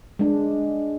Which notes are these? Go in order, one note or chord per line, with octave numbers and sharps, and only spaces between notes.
G#3 D4